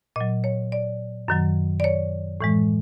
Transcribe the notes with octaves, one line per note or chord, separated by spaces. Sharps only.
A#2 F#3 D#5
C#5
D5
F#2 D#3 F#3
D5
C#5
A2 E3 G#3